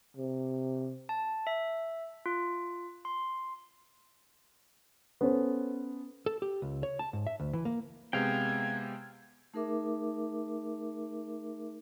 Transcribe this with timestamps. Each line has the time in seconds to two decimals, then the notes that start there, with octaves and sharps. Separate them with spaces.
0.17 C3
1.09 A5
1.47 E5
2.26 F4
3.05 C6
5.21 B3 C#4 A4 C5
6.26 A4
6.42 G4
6.62 C#2
6.83 C#5
6.99 A5
7.13 G#2
7.27 E5
7.40 D2
7.53 E3
7.65 A#3
8.13 C3 G#3 B3 F5 G5 G#6
9.54 A3 D#4 G#4 A#4 E5 D6